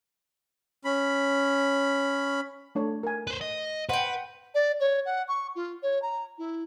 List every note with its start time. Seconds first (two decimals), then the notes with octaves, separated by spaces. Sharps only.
0.85 C#4 B5
2.75 A3 D4 C#5
3.03 A#4 G#5
3.27 B4 C5
3.41 D#5
3.89 B4 C5 F#5 G5
4.54 D5
4.80 C#5
5.05 F#5
5.28 C#6
5.55 F4
5.82 C#5
6.02 A#5
6.38 E4